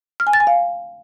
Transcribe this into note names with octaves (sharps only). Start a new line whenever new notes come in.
F6
G#5
A6
G#5
F5